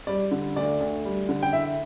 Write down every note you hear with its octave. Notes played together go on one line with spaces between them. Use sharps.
G3 D5
D3
D2 D5
D2
G3
D3
G5
E4 E5